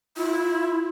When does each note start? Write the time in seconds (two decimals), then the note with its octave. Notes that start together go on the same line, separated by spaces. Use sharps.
0.17 E4 F4